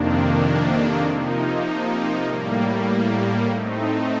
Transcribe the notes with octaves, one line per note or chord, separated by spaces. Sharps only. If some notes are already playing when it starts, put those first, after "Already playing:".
Already playing: F2 C3 D#3 A#3 D4
C3 F3 A#3 D#4
A2 G3 A#3
A2 A3 C4 D#4